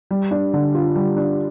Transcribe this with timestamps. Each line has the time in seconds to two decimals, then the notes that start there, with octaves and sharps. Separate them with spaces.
0.11 G3
0.31 D4
0.54 D3
0.75 F4
0.95 G3
1.17 D4